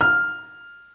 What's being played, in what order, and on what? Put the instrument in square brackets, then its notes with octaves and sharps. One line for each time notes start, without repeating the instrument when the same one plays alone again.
[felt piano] F6